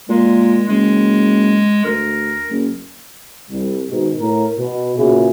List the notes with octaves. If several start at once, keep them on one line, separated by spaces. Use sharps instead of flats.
A#2 G#3
F#1 G#3
D2 A#4
F#1
C2 G3
G#2 B2 D#3
A2 A#4
B2
A#2 C#3 B3 E4 F#4 G#4